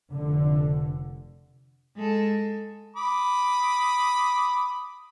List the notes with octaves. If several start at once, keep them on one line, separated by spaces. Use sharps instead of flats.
F1 D3
G#3 A4
B5 D6 D#6